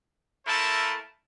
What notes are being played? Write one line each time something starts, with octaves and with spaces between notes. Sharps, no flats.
A3 A#3 E4 A#4 C5 A5